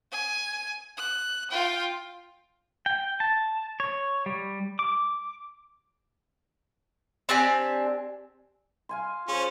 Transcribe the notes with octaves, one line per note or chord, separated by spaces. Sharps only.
G#5
F#6
F4 G5
G5
A5
C#5
G3
D6
C4 D4 G4 G#5
F5 G#5 C6
C#4 F4 G#4 C5